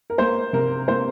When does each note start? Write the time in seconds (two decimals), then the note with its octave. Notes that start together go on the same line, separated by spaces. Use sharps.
0.10 A#4
0.18 A#3 C5
0.53 C3 A#4
0.88 A#3 C5